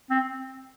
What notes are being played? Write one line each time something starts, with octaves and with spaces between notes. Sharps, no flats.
C4